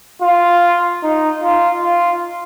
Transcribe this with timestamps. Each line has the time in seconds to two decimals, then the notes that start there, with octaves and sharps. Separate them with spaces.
0.22 F4
1.03 D#4
1.43 F4
1.82 F4